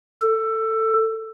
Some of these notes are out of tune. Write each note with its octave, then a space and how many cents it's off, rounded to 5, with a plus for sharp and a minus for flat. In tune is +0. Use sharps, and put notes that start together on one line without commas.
A4 +15